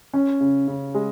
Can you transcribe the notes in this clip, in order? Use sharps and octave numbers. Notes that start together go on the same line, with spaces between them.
C#4
C#3
C#3
G#3